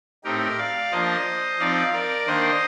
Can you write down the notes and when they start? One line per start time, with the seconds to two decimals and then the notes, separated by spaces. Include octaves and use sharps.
0.24 A2 A3 C4 D#4 G4 A#4
0.58 D5 F5
0.92 F3 A#3 D4 C5 D#5
1.59 F3 C4 D#4 D5 F5
1.93 A#4 D5
2.26 D#3 A#3 D4 C5 D#5